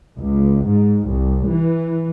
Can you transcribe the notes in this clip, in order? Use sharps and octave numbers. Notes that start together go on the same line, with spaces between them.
C#2
G#2
C2
E3